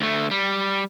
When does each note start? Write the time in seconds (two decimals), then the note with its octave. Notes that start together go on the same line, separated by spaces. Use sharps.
0.01 D2 A3
0.31 G3